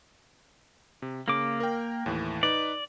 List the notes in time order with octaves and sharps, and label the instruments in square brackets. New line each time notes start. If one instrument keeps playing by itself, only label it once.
[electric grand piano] C3
[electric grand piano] C#3 [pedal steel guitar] A#3 D6
[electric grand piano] A#4 G5
D#2 A2 E3
[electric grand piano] D#4 B4 [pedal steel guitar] D5